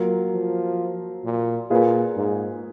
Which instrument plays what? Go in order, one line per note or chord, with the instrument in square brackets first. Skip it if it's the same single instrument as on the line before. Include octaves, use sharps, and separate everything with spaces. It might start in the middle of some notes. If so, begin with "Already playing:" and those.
Already playing: [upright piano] F#3 A#3 F4 A#4
[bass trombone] F3
A#2
[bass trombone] A#2 [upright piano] A#3 F4 G#4 B4
[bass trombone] G#2